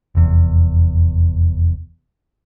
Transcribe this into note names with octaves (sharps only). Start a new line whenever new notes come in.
F1 E2